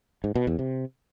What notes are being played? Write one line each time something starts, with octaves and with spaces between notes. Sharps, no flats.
G#2
B2
E2
C3